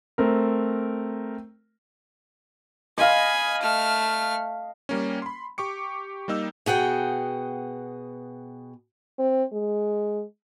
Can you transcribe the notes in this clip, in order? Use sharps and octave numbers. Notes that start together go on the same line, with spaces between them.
A3 C4 A#4
D#5 F5 G#5 B5
A3 F6
G3 A#3 C#4
B5 C6
G4 C#6 D6 C#7
G3 A#3 D#4 E6
B2 G#4 F#5 G5
C4
G#3